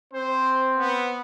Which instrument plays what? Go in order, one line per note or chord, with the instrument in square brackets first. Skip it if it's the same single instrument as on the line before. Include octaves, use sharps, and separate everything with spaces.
[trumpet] C4 [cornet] C5
[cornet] B3